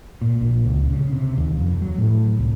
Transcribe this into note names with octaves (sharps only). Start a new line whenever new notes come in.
A#2
A#1
C#2
C#3
C3
D#2
F2
F#3
A2
C2